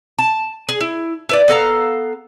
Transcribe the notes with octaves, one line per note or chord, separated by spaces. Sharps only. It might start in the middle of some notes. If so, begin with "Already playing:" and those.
A5
G#4
E4
E4 B4 D5
B3 A4 F5 A#5